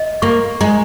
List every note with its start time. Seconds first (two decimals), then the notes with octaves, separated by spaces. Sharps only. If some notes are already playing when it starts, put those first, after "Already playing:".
Already playing: D#5
0.22 A#3 C#6
0.61 G#3 A#5